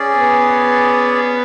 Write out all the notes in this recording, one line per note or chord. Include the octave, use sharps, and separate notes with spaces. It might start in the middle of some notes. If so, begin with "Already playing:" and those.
Already playing: C#4 G#4 D5
B3